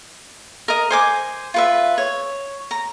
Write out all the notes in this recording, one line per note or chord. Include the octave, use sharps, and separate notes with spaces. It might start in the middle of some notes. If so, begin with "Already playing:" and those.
A#4 D#5
C5 G#5 D6
F4 B4 E5
C#5
A#5